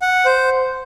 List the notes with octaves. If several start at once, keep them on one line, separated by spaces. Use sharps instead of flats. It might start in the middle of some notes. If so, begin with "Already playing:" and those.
F#5
C5